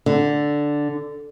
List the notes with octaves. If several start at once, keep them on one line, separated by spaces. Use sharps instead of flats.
D3